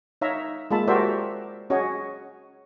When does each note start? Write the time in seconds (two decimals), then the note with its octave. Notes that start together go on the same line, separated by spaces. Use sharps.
0.21 D#4 C#5 E5 F5 A#5
0.71 G#3 A#3 F4 E5 A5 B5
0.88 F#4 G4 A#4 C5 D5 E5
1.70 C#4 F#4 G#4 C#5 D#5